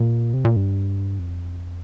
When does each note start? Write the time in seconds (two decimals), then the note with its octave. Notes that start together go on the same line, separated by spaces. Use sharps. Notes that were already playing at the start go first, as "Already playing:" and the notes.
Already playing: A#2
0.34 C3
0.45 A#2
0.56 G2
1.19 F2